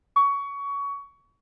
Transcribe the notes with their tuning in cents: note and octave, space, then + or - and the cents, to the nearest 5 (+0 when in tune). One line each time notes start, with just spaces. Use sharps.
C#6 +20